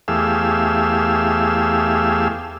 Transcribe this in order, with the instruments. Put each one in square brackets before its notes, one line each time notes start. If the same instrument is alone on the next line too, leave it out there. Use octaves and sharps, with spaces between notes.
[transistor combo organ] E2 A3 G4 G#4 F5 E6